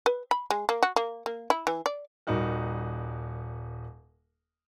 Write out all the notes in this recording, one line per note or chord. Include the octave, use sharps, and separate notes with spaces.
B4
B5
G#3
A#3
F#4
A#3
A#3
E4
E3
D5
D#1 G3 D#4 F#4 A#4